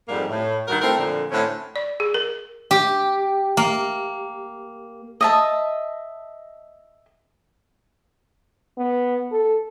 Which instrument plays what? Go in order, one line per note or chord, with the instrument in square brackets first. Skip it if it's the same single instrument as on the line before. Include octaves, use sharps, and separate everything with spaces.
[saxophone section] F2 G#2 G3 A#3
A2
G2 D#3 F#4 A#4
A3 C4 E4 A#4
F2 A#2 D3
A2 D3 C4 C#4
[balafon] D5
G#4
A#4
[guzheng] G4
A#3
[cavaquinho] D#5 E5 A5
[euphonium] B3
A4